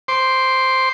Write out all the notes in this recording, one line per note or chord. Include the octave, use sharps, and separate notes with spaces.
C5 C6 D6